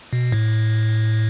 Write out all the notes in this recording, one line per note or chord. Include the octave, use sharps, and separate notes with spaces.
B2
A2